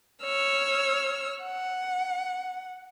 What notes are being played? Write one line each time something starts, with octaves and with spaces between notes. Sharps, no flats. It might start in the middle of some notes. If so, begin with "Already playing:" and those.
C#5 E6 F6
F#5